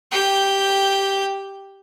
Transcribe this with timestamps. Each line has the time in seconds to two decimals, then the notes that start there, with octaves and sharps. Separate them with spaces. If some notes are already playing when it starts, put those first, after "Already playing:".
0.12 G4 G5